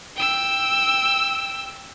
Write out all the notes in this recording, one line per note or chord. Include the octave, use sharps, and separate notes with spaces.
G5 E6